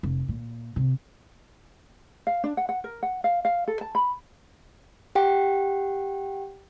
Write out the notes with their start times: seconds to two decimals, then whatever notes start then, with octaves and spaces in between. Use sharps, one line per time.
0.03 F1
0.29 A#2
0.76 C3
2.27 F5
2.44 D4
2.57 F#5
2.69 F#5
2.84 A#4
3.03 F#5
3.24 F5
3.45 F5
3.68 A4
3.81 A5
3.95 B5
5.15 G4 F#5 G5